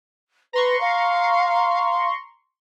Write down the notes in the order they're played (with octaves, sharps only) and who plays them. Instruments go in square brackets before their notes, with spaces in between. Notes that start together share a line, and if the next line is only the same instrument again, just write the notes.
[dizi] B4 [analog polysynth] A#5 C6 C#6
[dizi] F5